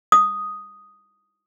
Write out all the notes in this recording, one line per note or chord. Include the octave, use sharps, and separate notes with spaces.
D#6